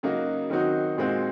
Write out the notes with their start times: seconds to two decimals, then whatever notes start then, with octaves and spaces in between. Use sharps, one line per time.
0.03 C#3 F#3 A#3 D#4 F#4
0.50 D#3 F#3 C4 D#4 F#4
0.97 A#2 G#3 C4 D#4 F#4